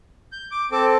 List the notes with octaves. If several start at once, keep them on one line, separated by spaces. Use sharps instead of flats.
G6
D6
C4 A4 D6